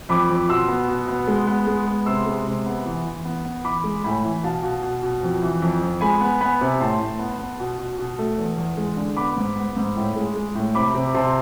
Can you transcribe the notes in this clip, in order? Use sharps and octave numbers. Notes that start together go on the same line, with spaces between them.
F2 B5 D6
F2
B2 C6 E6
B3
B2
B3
G#3
B3
G#3
B3
C3 C6 E6
G#3
C3
B3
E3
E3
B3
B3
E3 B5 D6
G#3
A2 G#5 B5
E3
B2 F5 A5
B2
B2
B2
F2
E3
F2
F2
G#3 G#5 B5
B3
B3 G#5 B5
C3
A2 A5 C6
A2
B3
B3
B2
B2
B2
A3
E2
E2
G#3
D3
B3 B5 D6
G#2
B3
G#2
A2
G#3
G#3
A2
C3 B5 D6
C3
C3 A5 C6